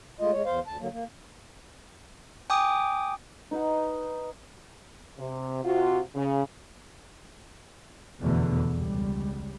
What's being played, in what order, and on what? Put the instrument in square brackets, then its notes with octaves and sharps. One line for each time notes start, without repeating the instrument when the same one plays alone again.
[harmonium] G#3 A3 F4 D#5
G#3 C#5
E2 C5 F5
D2 A5
D3 F#3 A#3
A#3
[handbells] G5 G#5 D6 D#6
[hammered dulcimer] D#4 B4 D#5 F#5
[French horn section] C3
C3 F4 F#4
C#3
[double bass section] F1 E2 B2 D3 A3 B3
C#2 G3